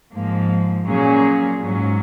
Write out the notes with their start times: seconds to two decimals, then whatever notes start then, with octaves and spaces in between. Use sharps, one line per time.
0.13 G#2 F3 A#3
0.86 A#2 F#3 A#3 C#4 G#4
1.59 G#2 F#3 C#4